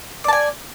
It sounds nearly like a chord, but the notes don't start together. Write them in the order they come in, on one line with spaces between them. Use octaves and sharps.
D5 A5 G#5